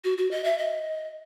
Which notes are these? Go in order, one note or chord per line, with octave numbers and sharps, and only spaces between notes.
F#4
F#4
D#5
E5
D#5